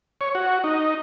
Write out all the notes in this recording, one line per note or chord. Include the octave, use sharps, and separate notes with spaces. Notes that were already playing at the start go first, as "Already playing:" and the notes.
C#5
F#4
D#4